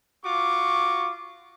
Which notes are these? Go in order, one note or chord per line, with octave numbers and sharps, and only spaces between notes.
F4 F#4 C#6 D6